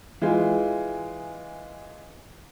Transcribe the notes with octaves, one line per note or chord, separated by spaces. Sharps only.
E3 G#3 F4